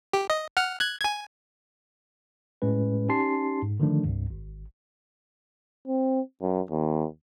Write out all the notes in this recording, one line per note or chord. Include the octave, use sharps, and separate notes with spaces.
G4
D#5
F#5 F6
F#6 G#6
G#5 G#6
A2 G#3 C#4 B4
C#4 D#4 G4 A5 C6 C7
G#2
D3 D#3 F3 A3 D4
C2 G2
G#1
C4
F#2
D#2